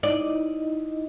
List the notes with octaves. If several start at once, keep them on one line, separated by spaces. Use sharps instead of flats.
D#4 E4 D5 D#5